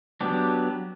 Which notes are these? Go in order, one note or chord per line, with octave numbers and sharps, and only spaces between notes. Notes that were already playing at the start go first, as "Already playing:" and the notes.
F#3 B3 D4 G4